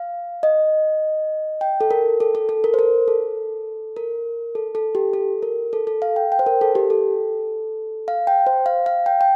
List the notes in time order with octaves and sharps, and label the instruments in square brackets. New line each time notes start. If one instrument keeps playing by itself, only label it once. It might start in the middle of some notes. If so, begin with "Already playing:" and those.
Already playing: [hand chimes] F5
D#5
G5
A4
A#4
A4
A4
A4
A#4
C5
A#4
A4
A#4
A4
A4
G4
A4
A#4
A4
A4
F5
G5
G5
C5
A#4
A4
G4
A4
F5
G5
C5
F5
F5
G5
G5